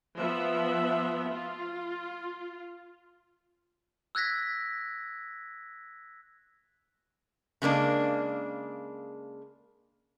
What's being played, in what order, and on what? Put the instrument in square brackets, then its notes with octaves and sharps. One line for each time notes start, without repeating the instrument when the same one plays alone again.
[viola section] F3 B3 E5
F4
[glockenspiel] E6 F#6 G#6 A#6 B6
[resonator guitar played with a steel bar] C#3 G#3 A#3 D4